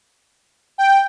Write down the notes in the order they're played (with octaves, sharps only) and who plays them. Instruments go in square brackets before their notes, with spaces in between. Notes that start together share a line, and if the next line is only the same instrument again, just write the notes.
[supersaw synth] G5